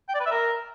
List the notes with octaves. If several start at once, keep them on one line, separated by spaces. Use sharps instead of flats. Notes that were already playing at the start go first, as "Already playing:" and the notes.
G5
D5
B4
E5
A#4